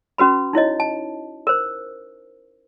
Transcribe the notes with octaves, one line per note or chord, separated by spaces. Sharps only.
C#4 F#4 B4 B5
D#4 E4 C#5 D#5
A5
A#4 C5